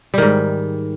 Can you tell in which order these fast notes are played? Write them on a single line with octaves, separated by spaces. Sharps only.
G3 D#3 G#2